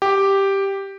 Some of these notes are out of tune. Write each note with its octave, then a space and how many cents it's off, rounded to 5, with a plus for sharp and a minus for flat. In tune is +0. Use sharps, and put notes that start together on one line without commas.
G4 +0